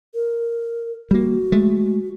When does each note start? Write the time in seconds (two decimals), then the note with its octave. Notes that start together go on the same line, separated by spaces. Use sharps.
0.14 A#4
1.11 G3 A#3 F#4
1.52 G#3 A3